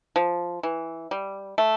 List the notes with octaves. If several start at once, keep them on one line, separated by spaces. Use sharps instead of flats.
F3
E3
G3
A3